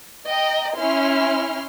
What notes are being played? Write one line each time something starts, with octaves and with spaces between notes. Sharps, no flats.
D#5 G5 A#5
C#4 E4 C6 F6